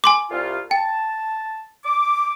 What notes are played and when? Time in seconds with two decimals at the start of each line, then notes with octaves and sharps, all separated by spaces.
0.04 G#5 C6 D6
0.31 C2 F4
0.71 G5 A5
1.85 D6